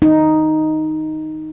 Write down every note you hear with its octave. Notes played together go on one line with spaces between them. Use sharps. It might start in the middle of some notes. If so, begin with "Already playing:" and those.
D#4